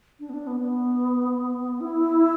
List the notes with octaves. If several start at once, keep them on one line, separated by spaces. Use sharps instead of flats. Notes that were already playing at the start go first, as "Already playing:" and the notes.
D4
B3
D4
B3
B3
E4